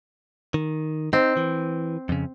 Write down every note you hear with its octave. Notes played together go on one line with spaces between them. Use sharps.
D#3
C4 D#4
E3
F2 C#3